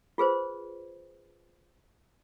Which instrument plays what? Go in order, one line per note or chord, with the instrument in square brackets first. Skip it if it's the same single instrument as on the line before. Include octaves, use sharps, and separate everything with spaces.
[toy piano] F4 G#4 B4 C5